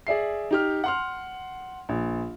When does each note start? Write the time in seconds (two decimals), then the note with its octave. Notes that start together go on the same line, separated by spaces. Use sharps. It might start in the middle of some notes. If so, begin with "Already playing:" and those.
0.07 G#4 D5 E5 C7
0.51 D#4 G4 F6
0.84 F#5 C6 F6
1.89 A#1